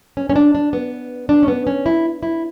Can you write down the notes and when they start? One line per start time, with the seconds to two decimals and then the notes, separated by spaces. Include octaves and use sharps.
0.17 C#4
0.29 C#4
0.36 D4
0.55 D4
0.73 B3
1.29 D4
1.43 C#4
1.48 B3
1.67 C#4
1.86 E4
2.23 E4